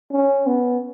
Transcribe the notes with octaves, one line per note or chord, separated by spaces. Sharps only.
C#4
B3